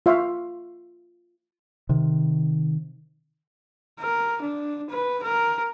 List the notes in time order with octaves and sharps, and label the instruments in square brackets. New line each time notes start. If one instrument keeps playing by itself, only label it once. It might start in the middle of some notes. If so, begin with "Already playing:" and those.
[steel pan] F4 E5 F5 C6 C#6
[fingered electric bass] C3 D#3
[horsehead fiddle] A#4
D4
B4
A#4